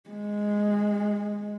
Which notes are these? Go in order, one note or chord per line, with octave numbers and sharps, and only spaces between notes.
G#3